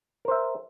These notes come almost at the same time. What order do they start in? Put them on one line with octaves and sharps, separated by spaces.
A#4 C5 E5